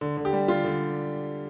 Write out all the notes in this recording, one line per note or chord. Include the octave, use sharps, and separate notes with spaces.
D3
D3
G4
G3
D3 F4
D3